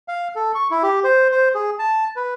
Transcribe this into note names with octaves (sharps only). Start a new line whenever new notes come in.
F5
A4
C#6
E4
G4
C5
C5
G#4
A5
B4